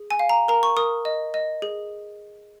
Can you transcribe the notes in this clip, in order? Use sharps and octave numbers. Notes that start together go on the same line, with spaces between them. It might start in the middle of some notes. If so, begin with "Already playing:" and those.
Already playing: G#4
G#5
F5
A#5
A#4 A#5
C#6
A#4 D#6
D#5
D#5
G#4